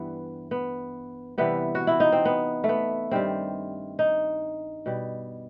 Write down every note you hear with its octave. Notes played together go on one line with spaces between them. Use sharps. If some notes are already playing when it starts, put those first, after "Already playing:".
Already playing: G2 E3 G3 B3
B3
C3 E3 G3 B3
F#4
E4
D#4
C4
B3
A3
B3
G2 D#3 G3 C4
D#4
B2 G3